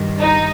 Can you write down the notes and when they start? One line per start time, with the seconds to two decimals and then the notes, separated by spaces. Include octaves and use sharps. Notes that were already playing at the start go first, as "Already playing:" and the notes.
Already playing: G2 D#3
0.21 D#4